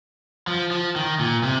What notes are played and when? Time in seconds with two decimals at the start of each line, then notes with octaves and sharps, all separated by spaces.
0.47 F3
0.71 F3
0.96 D#3
1.19 A#2
1.43 C3